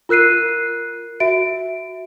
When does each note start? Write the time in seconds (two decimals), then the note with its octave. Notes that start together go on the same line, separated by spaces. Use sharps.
0.09 F4 A#4 F#6 C7 D#7
1.20 F#4 E5 D7